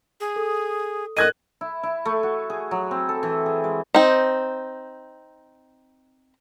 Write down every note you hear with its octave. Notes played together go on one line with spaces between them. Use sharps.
G#4
A4 D#6
A4 A#4 D#5 F#6 G#6 D#7
E4
E4
A3
F#4
G#4
F#3
C4
A4
E3
G#4
G#3
C4 D#4